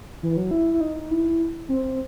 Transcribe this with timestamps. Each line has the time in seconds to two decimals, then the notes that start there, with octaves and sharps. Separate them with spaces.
0.23 E3
0.37 F#3
0.51 E4
0.74 E4
0.81 D#4
1.11 E4
1.69 C4